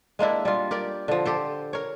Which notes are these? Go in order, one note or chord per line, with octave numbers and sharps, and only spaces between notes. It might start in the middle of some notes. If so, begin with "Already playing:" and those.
G#3 A#3 D4 E4
G3 F4
G4 A#4 D5
D3 F3
G4 A4 C5
A#4 C#5